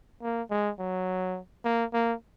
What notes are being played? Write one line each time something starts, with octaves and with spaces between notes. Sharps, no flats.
A#3
G#3
F#3
A#3
A#3